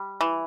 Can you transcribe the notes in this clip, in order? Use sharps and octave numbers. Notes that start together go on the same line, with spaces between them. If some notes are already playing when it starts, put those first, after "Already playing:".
Already playing: G3
E3